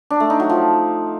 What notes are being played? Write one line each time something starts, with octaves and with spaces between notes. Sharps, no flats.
D4
A3
D#4
F#3
F3